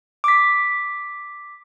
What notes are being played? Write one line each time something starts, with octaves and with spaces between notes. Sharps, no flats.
D6 B6